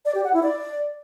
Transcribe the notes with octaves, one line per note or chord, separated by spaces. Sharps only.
D5
G4
F#5
E4
D5